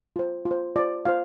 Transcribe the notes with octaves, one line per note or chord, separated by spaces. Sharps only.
F4 C5
F4
C5
F4 C5 D5
F4 C5 F5